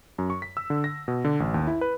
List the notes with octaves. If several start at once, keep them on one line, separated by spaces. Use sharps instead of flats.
F#2
C#6
B6
E6
D3
A#6
B2
D3
A1
D#2
E4
B4